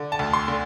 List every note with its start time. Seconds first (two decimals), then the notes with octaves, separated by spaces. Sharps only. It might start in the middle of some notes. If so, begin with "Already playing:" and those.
Already playing: D3
0.12 A5
0.19 D2
0.33 C6
0.48 D3